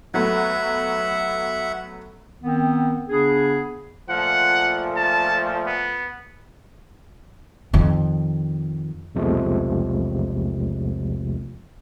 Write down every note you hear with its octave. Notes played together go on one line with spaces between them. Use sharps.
F#3 A3 B3 E5 F#5
D#3 B3 C4
C#3 B3 D4 G#4
A#2 F3 A3 F#5
A5
B3
F2 D#3
B1 E2 C3 F3 G#3 A3